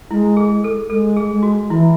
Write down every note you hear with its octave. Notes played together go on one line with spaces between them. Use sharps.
G#3 E4
G#4
A4
G#3 A4
G#4
G#3
F#4
E3 E4